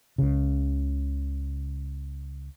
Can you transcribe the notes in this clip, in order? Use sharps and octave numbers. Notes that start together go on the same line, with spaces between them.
C#2 C#3